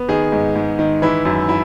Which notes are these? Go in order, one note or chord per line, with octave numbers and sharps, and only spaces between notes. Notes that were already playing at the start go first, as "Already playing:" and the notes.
Already playing: B3
D#3 G#4
G#2
G#2
D#3
E3 E4
F#2
E4